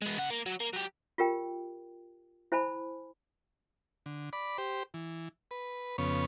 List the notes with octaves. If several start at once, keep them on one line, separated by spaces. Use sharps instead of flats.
G#3 B3
C#3 F#5
A#3
F#3
A#3
F#3 G4
F4 G4 A#4 G5
E4 C5 G#5 A5 B5
D3
D5 B5
G4 C5
E3
B4
F2 C#3 B3 C#5